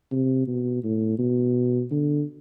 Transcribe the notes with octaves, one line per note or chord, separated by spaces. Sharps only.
C3
B2
A2
B2
D3